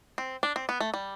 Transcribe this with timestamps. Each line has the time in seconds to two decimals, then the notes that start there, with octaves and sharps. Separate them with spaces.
0.18 C4
0.43 D4
0.56 C4
0.69 B3
0.80 A3
0.94 G3